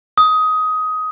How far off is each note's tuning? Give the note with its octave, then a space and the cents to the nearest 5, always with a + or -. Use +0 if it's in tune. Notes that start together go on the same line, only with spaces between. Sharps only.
D#6 +15